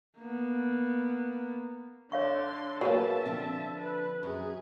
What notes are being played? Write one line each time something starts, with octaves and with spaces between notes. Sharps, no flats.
A#3 B3
D3 C#5 F5 C6 C#6
F#3 A#3 G#4 B4 E5 A5
D3 F3 C4
B4
F#2 G#4